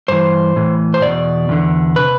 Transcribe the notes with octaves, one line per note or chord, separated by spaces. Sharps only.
G2 E3 C5
A2 E3
C5
E2 B2 D5
E2 D3
C3 B4